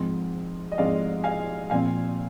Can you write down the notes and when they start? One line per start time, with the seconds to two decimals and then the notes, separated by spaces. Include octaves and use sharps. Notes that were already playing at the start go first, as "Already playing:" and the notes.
Already playing: G#2 F3 G#3 C4
0.72 D#5
0.78 G#2 F3 G#3 C4 D5 F5
1.24 F5 G#5
1.70 A#2 F3 C4 F5 G#5